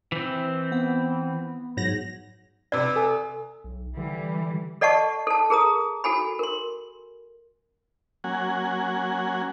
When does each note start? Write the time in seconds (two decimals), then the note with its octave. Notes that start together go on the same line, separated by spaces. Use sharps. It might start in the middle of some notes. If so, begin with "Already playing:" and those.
0.12 E3 C4
0.72 B3
1.77 G#2 F#3 A#6
2.72 C3 B4 D5
2.96 A4 G#5
3.64 B1
3.97 D3 E3 G3
4.81 A4 D5 D#5 F#5 A5 C#6
5.27 A4 A5
5.50 G#4 A#4 A#5 D#6
6.04 F#4 A4 G#5 B5
6.39 A#4 C6
8.24 F#3 A#3 C#4 F#5 G#5